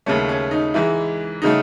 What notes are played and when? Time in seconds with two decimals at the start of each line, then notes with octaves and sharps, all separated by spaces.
0.06 D#2 C#3 F#3 A3 C#4
0.29 C#4
0.51 D#4
0.74 G#2 E3 G#3 E4
1.42 C#3 F#3 A3 D#4